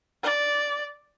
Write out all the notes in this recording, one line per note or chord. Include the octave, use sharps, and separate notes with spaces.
D5